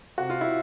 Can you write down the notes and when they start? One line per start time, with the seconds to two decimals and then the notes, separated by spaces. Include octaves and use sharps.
0.18 C3 F#4
0.30 F4
0.41 E4